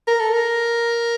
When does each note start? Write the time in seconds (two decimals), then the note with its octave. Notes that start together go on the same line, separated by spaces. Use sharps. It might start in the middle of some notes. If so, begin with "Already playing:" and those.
0.07 A#4
0.20 A4
0.32 A#4